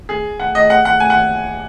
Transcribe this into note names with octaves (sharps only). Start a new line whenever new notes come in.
G#4
F#5
D#5
F#5
F#5
G#5
F#5